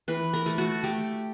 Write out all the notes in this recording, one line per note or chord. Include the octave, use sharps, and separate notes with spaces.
E3 B4
A#4
A3
F#4
A3 G4